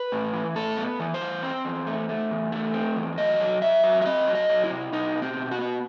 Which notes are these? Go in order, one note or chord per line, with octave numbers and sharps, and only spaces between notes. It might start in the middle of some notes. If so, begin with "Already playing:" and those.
Already playing: B4
A2
E3
A2 A4
B3
E3
C5
E3
C4
E2
A3
A3
E2
A3
C4
E2
F#3 D#5
F#3
F#3 E5
F#3
E5
C4 D#5
F#3
D#5
F#3
E4
C3
B2 D#4
B2
C4
B2
F#4
B3